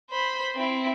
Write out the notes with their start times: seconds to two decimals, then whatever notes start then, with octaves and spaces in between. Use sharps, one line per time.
0.11 C5 B5
0.56 C4 E4